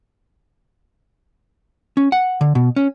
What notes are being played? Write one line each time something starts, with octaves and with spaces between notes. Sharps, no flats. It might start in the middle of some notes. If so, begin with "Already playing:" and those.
C#4
F#5
D3
B2
C#4